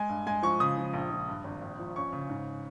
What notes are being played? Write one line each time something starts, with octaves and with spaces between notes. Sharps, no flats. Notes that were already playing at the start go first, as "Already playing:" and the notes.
Already playing: G#3 G#5
G2
G#3 G#5
F3 C#6
C#3 D#6
F3
A#1
F3
G2
G#1
A#1
F3
C#4 C#6
C#3
G#2